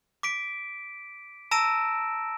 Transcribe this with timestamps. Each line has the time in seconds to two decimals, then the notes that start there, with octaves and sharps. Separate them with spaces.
0.23 D6 B6 D7
1.51 A5 A#5 E6 A#6 D7 E7